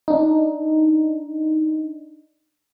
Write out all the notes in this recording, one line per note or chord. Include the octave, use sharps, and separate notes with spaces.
D4 D#4